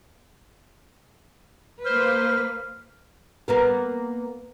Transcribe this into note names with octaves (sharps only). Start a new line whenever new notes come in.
A#3 B4 C5 F6
A#3 B3 A#4